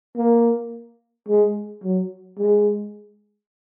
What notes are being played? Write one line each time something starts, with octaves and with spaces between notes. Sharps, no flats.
A#3
G#3
F#3
G#3